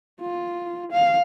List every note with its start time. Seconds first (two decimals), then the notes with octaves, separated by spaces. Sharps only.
0.21 F4
0.92 F5